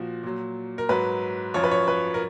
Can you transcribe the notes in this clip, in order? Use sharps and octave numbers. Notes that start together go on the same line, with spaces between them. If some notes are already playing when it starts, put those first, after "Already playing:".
Already playing: A#2 F3 F#4
A#2 F#3
A#4
G#2 F#3 B4
F#2 F3 C#5
B4
C#5
B4
A#4